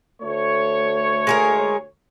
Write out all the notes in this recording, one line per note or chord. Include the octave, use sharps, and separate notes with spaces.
D2 A3 C#5
G#3 G#4 A#4